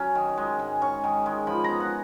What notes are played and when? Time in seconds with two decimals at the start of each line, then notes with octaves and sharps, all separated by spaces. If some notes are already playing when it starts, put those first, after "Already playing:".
Already playing: F#3 C#4
0.15 D#3
0.38 G#3
0.59 G#2
0.82 C#4 C#6
1.04 D#3
1.26 G#3
1.47 F3 B5
1.64 B3 A#5
1.80 F#5